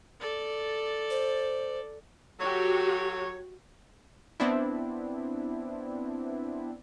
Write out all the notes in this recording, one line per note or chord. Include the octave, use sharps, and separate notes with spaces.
A4 D5
C5
F#3 F#4 G4 A4 C#5
B3 C4 D4 E4